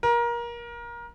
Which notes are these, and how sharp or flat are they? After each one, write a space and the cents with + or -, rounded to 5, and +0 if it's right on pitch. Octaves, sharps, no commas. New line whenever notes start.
A#4 +25